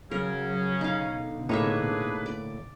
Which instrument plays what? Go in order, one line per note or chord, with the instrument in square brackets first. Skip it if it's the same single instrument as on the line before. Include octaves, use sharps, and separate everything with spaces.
[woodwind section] C#3 C#4 [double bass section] F#3 [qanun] A#4
[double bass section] B2 D3 [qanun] D#4 F5
[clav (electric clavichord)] A2 A#3 [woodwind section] D4 G#4 B4 [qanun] D#4 C#5 E5
[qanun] D5